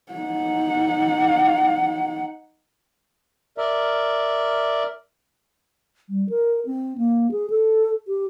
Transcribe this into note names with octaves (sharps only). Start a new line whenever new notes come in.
D#4 F#5
A#4 D5 E5
G3
A#4
C4
A#3
G#4
A4
G4